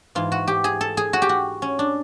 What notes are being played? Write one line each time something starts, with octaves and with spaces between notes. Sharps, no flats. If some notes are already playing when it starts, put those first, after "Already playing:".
G#2 E3 F4
F#4
G4
G#4
A4
G#4
F#4
G4
F#4
C#4
D4